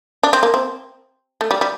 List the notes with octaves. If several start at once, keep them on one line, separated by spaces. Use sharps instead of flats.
D4
C4
A#3
C4
A3
G3
G3